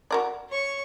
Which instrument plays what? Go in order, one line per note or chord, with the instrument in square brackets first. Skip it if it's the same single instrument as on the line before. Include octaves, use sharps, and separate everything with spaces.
[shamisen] F#4 A#4 D5
[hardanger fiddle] C#5 C#6